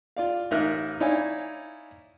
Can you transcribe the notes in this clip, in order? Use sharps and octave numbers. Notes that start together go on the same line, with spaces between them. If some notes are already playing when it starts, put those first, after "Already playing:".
F4 D5 F5
A1 D#4 A#4 E5 F5 F#6
D#4 E4 C#5 D5 F5 G#5